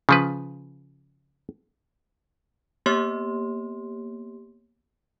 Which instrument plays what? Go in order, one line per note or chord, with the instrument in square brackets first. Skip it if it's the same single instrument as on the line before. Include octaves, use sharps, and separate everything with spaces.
[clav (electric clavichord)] C#3 F3 B4
[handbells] A#3 B3 G4 C#5 C6